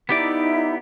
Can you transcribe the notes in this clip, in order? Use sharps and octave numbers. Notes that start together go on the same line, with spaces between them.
B3 D#4 E4 G4 D5 E5